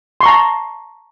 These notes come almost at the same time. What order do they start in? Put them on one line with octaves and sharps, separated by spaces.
C6 C#6 A#5 A5